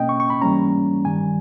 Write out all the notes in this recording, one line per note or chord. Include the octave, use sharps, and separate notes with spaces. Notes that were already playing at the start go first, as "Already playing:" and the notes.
Already playing: B2 A#3 C#4 D#5 G5
C#6
C#6
B5
G#2 E3 G3 A#3 C#4 A#5
G2 D#3 G3 G#5